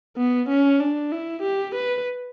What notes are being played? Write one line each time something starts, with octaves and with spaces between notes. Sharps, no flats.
B3
C#4
D4
E4
G4
B4